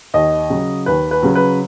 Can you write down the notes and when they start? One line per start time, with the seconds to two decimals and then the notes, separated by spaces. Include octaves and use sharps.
0.14 D#2 D#5
0.50 C#3 F#3
0.86 D#2 B4
1.11 B4
1.23 C#3 F#3
1.35 B4